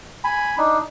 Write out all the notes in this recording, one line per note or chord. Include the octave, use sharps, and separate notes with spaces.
G#5 B5
D4 D#4